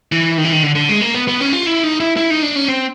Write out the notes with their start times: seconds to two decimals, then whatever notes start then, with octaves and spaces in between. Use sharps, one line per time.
0.12 E3
0.38 D#3
0.44 E3
0.52 D#3
0.63 D3
0.76 D3
0.89 G#3
1.01 A#3
1.14 B3
1.28 B3
1.41 C#4
1.52 F4
1.67 E4
1.83 D#4
2.00 E4
2.17 E4
2.30 D#4
2.42 D4
2.56 C#4
2.68 C4